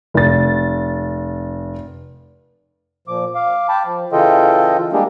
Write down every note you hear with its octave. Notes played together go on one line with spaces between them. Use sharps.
F1 A6
A#2 F3 D6
F5 D6
G5 A5 B5 D6
F3
C#3 E3 F4 A4 D#5 G5
G3 G#3 A#3 D4 G4 G#4